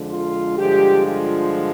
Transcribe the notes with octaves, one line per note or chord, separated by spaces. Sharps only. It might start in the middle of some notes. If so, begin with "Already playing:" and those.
Already playing: F2 D3 F3 G#3
F4
G2 D3 F3 G#3 G4
F4